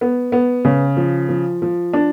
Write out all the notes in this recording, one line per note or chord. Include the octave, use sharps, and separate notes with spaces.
B3
B3
C#3
F3
F3
F3
D4